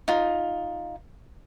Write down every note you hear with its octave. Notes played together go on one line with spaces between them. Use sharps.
D#4 F4